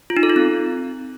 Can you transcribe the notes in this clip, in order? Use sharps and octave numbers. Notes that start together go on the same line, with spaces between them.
F4
D#4
A4
F4
C4